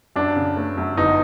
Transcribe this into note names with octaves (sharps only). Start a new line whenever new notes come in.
F#2 D4
C#3
A3
F#2
G1 D#4